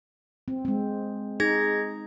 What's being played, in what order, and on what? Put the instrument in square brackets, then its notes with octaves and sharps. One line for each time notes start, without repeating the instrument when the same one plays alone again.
[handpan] C4
G#3 C4
[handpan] D#4 [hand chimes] G#4 G#6 A#6